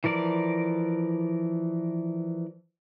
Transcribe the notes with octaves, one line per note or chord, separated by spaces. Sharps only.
E3 F3 A#4 D5